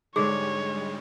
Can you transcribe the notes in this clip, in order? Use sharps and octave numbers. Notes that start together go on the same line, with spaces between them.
G#2 D3 G3 G#3 G#4 C#5